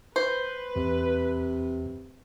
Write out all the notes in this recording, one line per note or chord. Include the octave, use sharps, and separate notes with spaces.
B4 C5
E2 C3